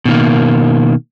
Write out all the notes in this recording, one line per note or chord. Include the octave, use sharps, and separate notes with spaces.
B2 D#3 A#3